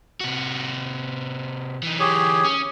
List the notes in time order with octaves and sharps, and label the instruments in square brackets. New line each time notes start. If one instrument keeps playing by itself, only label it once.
[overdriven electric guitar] C3 F#4
E3 D#4
[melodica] G4 G#4 C#5
[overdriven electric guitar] C#4